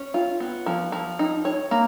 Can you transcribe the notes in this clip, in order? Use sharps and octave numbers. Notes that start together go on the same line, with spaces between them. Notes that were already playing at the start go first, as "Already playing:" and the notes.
Already playing: C#4
F4
B3
F3
F3
D#4
C#5
A#3